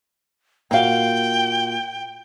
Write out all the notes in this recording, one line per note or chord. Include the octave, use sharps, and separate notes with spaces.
A#2 A#3 F#4 F5 G5